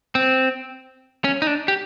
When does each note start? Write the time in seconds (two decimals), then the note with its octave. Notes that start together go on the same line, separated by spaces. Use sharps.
0.15 C4
1.24 C#4
1.42 D#4
1.47 D4
1.68 G4